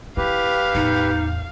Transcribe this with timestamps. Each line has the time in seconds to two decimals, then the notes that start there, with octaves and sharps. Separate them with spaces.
0.17 E4 G4 B4 F5
0.75 E2 A2 D#4